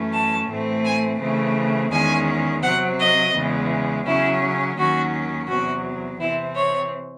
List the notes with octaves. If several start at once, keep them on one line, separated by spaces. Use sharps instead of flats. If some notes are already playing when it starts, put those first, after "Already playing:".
Already playing: F#2 E3 A3 C#4
A5
A2 E3 A3 C4
G#5
C#3 E3 A3 C4
E2 D#3 G#3 C#4 G#5
C3 F#3 C4 F#5
D#5
E2 C#3 E3 G#3
C#3 F#3 C#4 E4
D#2 D#3 F#3 C#4 F#4
E2 C3 F#3 F#4
C3 E3 C4 E4
C#5